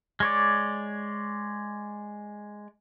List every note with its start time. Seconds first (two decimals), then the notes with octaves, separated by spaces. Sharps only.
0.20 G#3 C#5 D5